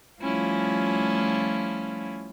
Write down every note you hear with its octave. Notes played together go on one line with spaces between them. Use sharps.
F3 G3 A3 C#4 E4 F4